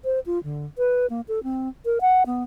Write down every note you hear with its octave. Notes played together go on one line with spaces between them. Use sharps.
C5
F4
D3
B4
A#3
A4
C4
A#4
F#5
B3